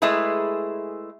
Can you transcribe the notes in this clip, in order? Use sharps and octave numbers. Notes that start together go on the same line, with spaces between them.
G#3 A3 E4 G#4 B4